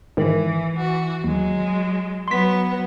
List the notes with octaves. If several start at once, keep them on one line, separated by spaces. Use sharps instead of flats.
G#2 D#3 E3
E3 F#4
D#2 F#3 G#3
F#3 B3 C6 B6